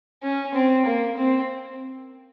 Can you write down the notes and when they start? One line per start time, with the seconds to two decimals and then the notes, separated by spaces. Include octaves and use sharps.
0.23 C#4
0.54 C4
0.86 A#3
1.18 C4